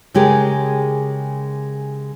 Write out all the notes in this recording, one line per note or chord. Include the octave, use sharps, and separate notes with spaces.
C#3 G#3 G4 G#4 A#4